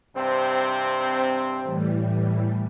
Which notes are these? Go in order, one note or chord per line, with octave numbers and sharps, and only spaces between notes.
G2 C3 C4
A2 E3 G3